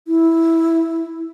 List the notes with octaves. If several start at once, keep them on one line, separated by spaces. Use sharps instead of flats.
E4